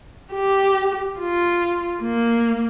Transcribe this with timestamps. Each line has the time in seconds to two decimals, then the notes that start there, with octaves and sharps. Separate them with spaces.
0.33 G4
1.20 F4
2.02 A#3